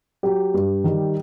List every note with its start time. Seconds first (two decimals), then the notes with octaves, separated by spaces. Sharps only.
0.23 F#3 G4
0.54 G2
0.84 D#3 G3